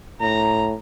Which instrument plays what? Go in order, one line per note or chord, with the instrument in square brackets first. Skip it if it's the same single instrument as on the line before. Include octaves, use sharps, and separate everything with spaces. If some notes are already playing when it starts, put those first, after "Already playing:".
[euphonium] A2 [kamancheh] A#5